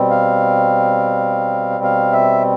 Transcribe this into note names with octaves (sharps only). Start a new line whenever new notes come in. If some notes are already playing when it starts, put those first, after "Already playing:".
Already playing: B2 G3 C4
F5
F5
E5